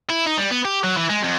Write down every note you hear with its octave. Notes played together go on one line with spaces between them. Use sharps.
E4
D#4
G3
B3
G4
F#3
E3
G#3
F2